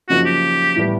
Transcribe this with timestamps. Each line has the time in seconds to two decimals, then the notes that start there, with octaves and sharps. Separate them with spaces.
0.09 F#2 C#3 F3 A#3 D#4 F#4
0.25 G4
0.76 A2 E3 G3 B3